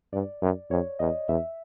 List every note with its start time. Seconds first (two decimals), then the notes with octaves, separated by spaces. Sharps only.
0.13 G2 D5
0.42 F#2
0.71 F2 C#5
0.99 E2 D#5
1.29 E2 E5